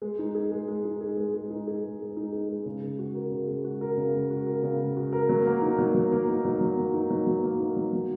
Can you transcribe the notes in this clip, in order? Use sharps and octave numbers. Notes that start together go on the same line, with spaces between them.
G#3
D#4
G#4
G#3
G#3
D#4
G#4
G#3
G#3
D#4
G#4
G#3
G#3
D#4
G#4
G#3
C#3
G#3
F#4
A#4
C#3
G#3
F#4
A#4
C#3
G#3
F#4
A#4
C#3
G#3
F#4
A#4
F#3
A#3
D#4
F#3
F#3
A#3
D#4
F#3
F#3
A#3
D#4
F#3
F#3
A#3
D#4
F#3
F#3